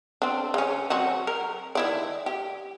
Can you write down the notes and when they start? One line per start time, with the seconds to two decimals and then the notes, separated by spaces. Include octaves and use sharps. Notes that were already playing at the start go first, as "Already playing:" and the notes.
0.22 C4 D4
0.54 C#3 C#4
0.90 F#3 C4 F#4
1.27 A#4
1.75 D#3 E4 D5
2.26 G4